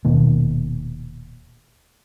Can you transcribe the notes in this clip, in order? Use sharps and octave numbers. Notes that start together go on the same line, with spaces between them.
D#1 B2 D#3 A#3